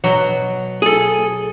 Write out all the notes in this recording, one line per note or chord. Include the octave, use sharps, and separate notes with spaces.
B2 F#3
G#4 A4